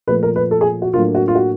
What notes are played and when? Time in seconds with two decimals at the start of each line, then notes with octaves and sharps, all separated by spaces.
0.08 A#2 F3 A3 B4
0.23 A#4
0.36 B4
0.51 A4
0.61 G#4
0.82 F#4
0.94 A2 F#3 A#3 D4 F4
1.15 F#4
1.28 F4
1.35 F#4